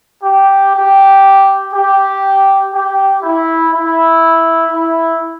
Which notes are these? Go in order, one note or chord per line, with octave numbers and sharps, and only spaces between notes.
G4
G4
G4
G4
E4
E4
E4